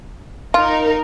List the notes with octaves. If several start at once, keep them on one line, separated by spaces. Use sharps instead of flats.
D#4 F4 A#4